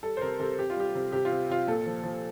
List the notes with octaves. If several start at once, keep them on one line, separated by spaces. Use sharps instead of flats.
G3 A4
C5
C3 A#4
C3 A4
C3 G4
F4
G3 G4
C3
C3 G4
F4
C3
C3 F4
A#2 A4
F3
F3